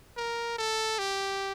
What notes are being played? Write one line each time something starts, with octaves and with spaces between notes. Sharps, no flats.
A#4
A4
G4